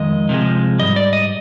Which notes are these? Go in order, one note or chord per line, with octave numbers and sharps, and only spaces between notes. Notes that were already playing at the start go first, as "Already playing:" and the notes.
Already playing: F2 D#3 G#3 D#5
C3 F3 G#3
G#2 G3 D#5
D5
D#5